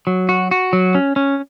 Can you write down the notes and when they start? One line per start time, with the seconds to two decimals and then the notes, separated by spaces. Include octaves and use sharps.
0.07 F#3
0.29 F#4
0.51 F#4
0.73 F#3
0.95 C#4
1.16 C#4